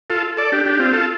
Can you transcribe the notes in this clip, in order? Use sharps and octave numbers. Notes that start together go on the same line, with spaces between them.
F4 A4
A4 D5
D4 G4
D4 G4
C4 F4
F4 A4